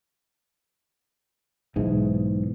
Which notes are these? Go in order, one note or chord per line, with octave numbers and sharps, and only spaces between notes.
B1 G#2 E3